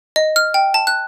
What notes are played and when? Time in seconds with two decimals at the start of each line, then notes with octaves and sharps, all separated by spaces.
0.16 D#5
0.36 F6
0.54 G5
0.74 A5
0.87 F#6